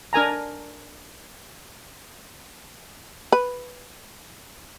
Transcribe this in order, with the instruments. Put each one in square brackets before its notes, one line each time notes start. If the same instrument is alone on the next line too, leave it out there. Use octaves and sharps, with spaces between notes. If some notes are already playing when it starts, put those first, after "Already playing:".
[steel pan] D4 A#4 G#5 A#5
[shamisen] B4